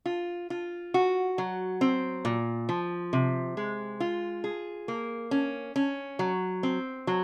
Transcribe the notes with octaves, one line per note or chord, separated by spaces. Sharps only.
F4
F4
F#4
F#3
C4
A#2
F3
C3
G#3
F4
G#4
A#3
C#4
C#4
F#3
C4
F#3